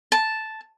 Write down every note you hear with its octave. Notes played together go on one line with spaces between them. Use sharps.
A5